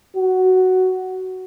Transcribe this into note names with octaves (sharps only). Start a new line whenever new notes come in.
F#4